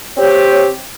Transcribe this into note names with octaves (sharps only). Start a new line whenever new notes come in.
C4 G4 C#5